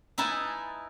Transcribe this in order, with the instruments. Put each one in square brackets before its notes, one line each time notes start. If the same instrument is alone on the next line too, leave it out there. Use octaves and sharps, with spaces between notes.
[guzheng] D#4 E4 B4 G#5 A5